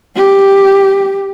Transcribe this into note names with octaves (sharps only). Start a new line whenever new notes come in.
G4